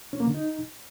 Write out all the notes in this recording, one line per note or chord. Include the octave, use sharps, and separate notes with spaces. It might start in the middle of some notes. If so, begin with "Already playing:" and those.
C#4
A#3
D3
D#4